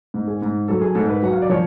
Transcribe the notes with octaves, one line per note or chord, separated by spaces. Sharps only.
G#2
G#4
G#2
F#3 A4
G#4
G#2 A4
B4
F#3 F#5
F5
D5
F3 C#5